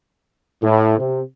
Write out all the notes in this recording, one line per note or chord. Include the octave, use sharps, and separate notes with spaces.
A2
C3